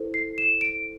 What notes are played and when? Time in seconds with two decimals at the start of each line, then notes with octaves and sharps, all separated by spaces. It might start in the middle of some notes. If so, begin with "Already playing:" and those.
Already playing: E4 A4 C5
0.14 C7
0.38 E7
0.61 D7